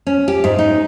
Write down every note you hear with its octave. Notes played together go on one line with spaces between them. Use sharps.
C#4
G4
G#2
D#4